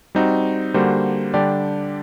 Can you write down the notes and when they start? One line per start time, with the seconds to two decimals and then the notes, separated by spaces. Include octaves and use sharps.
0.15 G3 C4 D#4 F#4
0.74 D3 G3 A#3 F#4 C5
1.34 D3 G3 D4 G4 D5